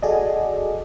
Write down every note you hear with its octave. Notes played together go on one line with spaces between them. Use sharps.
F#4 G#4 A4 D5 D#5